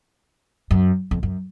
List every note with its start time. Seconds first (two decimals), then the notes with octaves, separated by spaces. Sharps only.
0.71 F#2
1.11 F2
1.23 F#2